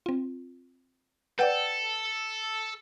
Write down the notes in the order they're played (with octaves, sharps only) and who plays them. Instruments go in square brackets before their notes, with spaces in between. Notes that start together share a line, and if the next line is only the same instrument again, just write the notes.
[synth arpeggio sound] C4 F4
[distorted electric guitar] A4 [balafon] B4 F#5 [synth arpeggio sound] D5 G5 G6